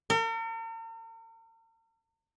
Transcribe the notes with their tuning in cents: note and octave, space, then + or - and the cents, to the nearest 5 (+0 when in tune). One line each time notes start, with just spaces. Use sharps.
A#4 -45